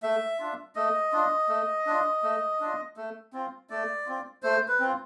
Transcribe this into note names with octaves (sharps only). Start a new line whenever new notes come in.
A3 E5
D4 F4
A3 D#5
D4 F4
A3
D4 F4
A3
D4 F4
A3
C4 F4
A3 D5
C4 F4
A3 C5
B4
C4 F4